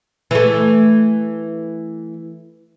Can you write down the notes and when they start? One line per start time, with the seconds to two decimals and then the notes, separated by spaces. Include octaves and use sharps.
0.31 E3 A3